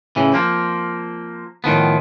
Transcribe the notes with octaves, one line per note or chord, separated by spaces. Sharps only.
A2 C#3 E3
F3 A#3 C4
A2 D#3 F3 B3